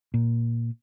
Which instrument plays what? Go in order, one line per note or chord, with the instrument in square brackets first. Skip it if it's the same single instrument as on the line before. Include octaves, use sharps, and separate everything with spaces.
[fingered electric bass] A#2